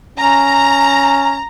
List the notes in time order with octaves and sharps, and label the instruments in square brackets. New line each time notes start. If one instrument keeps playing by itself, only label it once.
[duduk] C#4 [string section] A#5